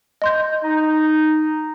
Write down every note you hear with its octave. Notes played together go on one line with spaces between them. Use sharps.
D#5 C6 G6
D#4